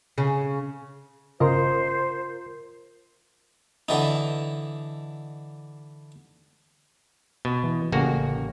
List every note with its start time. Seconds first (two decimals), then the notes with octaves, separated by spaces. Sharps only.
0.18 C#3
1.40 G1 C#3 F4 A#4 C5 D#5 C6
3.89 D3 E3 D#4
7.45 B2
7.64 E3
7.92 A1 C#3 A#3 F#4